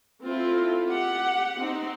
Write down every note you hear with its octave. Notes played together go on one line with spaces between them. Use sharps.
C4 E4 F4 A4
G4 F#5
C4 D#4